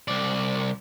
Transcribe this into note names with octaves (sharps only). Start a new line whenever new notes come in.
C2 D5